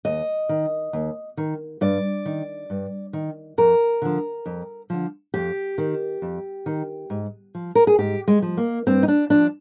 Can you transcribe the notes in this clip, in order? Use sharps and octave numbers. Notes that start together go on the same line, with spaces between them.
D#2 D#5
D#3
D#2
D#3
G2 D5
D#3
G2
D#3
F2 A#4
D3 F3
F2
D3 F3
F2 G4
D#3
F2
D#3
G#2
F3
A#4
G#4
G#2 G4
G#3
F3
A#3
G2 C4
D#4
D4
F3 D4